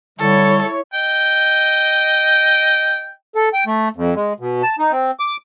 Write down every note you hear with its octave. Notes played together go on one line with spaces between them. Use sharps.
D3 G3 E4 A4 C#5
D#5 G5
A4
G5
A3
F2
G#3
B2
A5
D#4
C4
D6